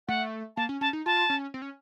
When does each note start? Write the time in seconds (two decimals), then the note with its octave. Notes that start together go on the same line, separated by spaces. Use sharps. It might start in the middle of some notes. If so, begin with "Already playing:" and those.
0.08 A3 F#5
0.57 A#3 A5
0.69 C#4
0.81 C#4 A5
0.93 D#4
1.06 F4 A5
1.30 C#4
1.54 C4
1.62 C#4